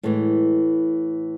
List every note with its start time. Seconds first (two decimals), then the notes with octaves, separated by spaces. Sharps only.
0.03 A2 E3 G#3